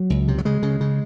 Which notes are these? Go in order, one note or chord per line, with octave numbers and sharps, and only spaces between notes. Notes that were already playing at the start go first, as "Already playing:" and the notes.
Already playing: F#3
C#2
C3
F#3
C#3 G#3
C#3
C#3